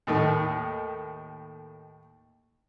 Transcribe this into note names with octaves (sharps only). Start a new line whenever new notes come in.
D#2 A2 D#3